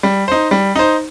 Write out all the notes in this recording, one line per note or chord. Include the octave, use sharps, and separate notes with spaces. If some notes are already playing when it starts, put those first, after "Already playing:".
G3
D#4 C5
G3
D#4 C5